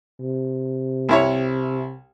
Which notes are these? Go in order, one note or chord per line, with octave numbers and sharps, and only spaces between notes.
C3
C2 E4 C#5